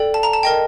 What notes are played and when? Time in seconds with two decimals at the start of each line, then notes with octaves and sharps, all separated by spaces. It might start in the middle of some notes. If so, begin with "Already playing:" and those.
Already playing: A4 D5 G5
0.14 A5
0.23 A#5
0.33 A5
0.43 A#4 D#5 G5